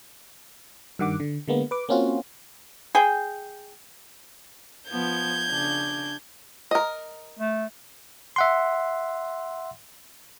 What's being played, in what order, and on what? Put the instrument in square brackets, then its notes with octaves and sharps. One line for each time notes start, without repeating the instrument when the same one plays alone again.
[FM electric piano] G2 D#3 F#5 D6
D3
D3 G#3 A#3 B3
B4 D6
A#3 C4 C#4 F4 F#4
[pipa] G#4 G5
[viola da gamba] F3 B3 [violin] G6 G#6
[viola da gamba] C#3 D4
[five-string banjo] A#4 D#5
[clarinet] A3
[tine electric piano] E5 F#5 C6